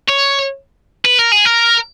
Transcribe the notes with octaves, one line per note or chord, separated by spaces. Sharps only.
C#5
B4
A#4
G#4
A#4